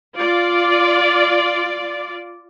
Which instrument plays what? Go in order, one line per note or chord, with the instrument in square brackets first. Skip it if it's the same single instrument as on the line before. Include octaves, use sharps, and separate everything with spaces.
[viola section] F4 D5